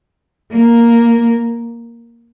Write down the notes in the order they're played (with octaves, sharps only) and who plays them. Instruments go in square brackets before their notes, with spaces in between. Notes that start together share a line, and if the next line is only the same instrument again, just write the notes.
[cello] A#3